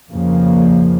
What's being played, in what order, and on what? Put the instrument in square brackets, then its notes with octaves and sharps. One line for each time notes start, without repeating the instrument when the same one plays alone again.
[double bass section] F2 C#3 F3 A#3